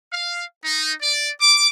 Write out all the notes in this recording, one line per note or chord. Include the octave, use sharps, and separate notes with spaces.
F5
D#4
D5
D6